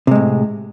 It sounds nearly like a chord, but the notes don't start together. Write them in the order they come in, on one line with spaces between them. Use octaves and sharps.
C3 G#3 A2